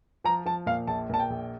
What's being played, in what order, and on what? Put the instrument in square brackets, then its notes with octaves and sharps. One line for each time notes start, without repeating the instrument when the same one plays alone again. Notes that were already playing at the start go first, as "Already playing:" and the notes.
[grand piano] F3 A#5
F3 A5
A#2 F5
A#1 A5
A#2 A5
G5
A#1